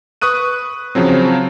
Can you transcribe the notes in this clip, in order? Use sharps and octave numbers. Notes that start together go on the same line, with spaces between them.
B4 C#6 D#6 F#6 D#7
C#3 F3 F#3 C4